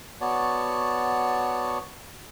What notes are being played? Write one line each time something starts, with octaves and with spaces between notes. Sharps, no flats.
B3 F#4 C#5 D5 A5